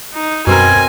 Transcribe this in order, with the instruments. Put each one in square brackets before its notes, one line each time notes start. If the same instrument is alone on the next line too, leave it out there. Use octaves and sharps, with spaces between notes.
[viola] D#4
[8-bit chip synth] F#2 [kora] B2 C4 A#4 [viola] G#5